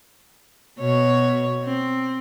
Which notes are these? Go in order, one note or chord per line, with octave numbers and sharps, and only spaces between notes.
B2 C#5
C4